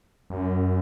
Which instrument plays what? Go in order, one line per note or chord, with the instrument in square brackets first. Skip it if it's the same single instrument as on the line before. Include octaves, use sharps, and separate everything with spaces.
[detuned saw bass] F#2